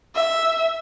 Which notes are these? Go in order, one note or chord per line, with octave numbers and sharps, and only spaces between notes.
E5